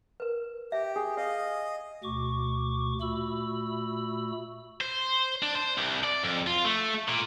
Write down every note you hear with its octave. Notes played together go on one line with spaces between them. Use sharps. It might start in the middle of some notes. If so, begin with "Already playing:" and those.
A#4 B4
G4 E5
G#4
D#5 F5
D2 B2 C#6 D6
A#2 A3 F#4 B5 E6
C5
D4
C5
C2
D5
F2
F4
A3
A#2